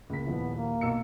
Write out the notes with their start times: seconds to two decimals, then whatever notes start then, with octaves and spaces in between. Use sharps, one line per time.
0.10 C#2 A#3 B6
0.26 D#1 F3 B3 E4
0.56 A#3
0.81 B1 E6 C#7